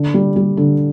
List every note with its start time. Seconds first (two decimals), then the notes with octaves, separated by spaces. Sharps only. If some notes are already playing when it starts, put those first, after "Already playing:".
Already playing: D3
0.14 G3
0.36 G3
0.57 D3